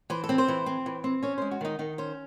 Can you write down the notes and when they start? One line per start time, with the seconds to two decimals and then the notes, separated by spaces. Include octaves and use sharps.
0.10 E3 C5
0.24 A4
0.29 C4
0.38 C5
0.48 E3
0.66 C4
0.86 E3
1.04 C4
1.23 C#4 C#5
1.38 G#3 C5
1.51 F#4
1.61 D#3 D#4
1.79 D#3 D#4
1.98 C#4 C5